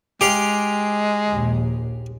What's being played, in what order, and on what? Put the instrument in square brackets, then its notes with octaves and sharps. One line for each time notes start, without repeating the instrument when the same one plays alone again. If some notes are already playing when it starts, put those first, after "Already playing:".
[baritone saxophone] G#3 [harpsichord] G4 F5
[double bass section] A#1 D#2